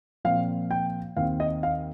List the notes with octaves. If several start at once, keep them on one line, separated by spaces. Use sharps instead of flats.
A#2 F3 C4 F5
G5
D#2 D#3 C4 F5
D#5
F5